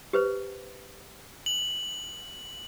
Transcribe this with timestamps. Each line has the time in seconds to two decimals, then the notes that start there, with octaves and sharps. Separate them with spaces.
0.13 G4 B4 C5
1.46 F#7